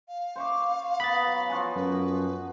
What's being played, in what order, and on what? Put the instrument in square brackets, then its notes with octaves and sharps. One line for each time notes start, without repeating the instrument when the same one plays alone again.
[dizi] F5
[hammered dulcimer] C5 C#6 D6
[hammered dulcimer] B3 A#5 [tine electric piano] B5 A6
[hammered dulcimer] F#3
F3 F#4 G#5
[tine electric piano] F#2 [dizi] B4